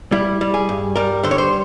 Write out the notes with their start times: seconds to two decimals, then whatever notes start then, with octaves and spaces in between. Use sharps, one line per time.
0.12 G3 E4
0.41 G3
0.54 G#4
0.69 G2
0.96 G3 A#4
1.23 D3 C5
1.31 C#5
1.38 C5